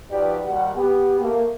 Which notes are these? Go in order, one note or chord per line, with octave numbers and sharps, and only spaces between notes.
F3 D#4 F#4 G4 B4 D5
D#2 G3 F#4 F#5
B3 G4
A3 A#3